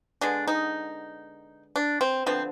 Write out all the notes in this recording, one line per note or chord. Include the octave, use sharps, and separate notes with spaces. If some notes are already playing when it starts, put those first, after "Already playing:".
D3 G#3 B3 D4
D#4
D4
C4
D3 F3 B3 C4